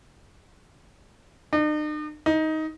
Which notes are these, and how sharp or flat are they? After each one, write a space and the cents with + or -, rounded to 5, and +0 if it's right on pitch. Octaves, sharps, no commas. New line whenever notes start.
D#4 -45
D#4 +15